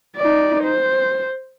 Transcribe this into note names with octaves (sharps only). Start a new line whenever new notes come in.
D#4 D5
C5